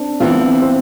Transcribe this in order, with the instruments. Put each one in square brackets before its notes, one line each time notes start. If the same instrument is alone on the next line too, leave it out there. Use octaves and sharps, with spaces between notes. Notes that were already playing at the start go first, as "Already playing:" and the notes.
Already playing: [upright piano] C4 D4
[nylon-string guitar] E3 B3 F4 [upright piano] C4
[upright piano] C4